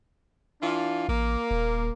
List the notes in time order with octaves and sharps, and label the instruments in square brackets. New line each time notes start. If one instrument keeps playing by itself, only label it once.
[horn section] E3 D4 F4
[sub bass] A1 [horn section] A#3
[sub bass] D#1